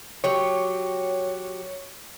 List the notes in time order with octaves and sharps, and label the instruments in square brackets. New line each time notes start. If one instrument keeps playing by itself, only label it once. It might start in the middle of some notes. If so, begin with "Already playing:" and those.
[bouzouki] F#3 G4 [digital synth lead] C#5